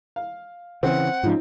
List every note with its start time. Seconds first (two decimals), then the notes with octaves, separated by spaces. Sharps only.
0.16 F5
0.83 C#3 E3 C4 F#5
1.23 G#2 F3 C#4 D#4 F4